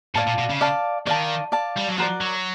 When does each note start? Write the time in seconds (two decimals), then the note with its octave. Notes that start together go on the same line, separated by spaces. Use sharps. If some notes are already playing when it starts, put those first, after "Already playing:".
0.15 A2 D5 F5 A5
0.27 A#2
0.38 B2
0.50 C#3
0.61 D5 F5 A5
1.06 D#3 D5 F5 A5
1.52 D5 F5 A5
1.77 G3
1.88 F#3
1.98 F3 F#4 A#4 D5
2.21 F#3